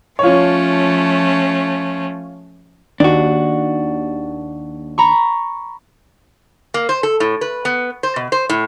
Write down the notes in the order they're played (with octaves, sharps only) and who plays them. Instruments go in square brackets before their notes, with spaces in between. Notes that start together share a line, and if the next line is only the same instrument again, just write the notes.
[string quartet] F3 A3 C#4 [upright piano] F4 C#5
[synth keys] D#2 [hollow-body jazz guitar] D4 F#4
[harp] A#5 B5 C#6
[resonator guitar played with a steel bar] A#3
C5
A4
A2
B4
B3
C5
B2
C5
A2